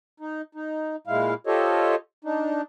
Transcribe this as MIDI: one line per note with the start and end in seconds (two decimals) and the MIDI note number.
0.20 0.42 63
0.55 0.96 63
1.07 1.34 46
1.07 1.34 56
1.07 1.34 64
1.07 1.34 77
1.47 1.95 65
1.47 1.95 67
1.47 1.95 69
1.47 1.95 72
1.47 1.95 73
1.47 1.95 75
2.24 2.62 62
2.24 2.62 63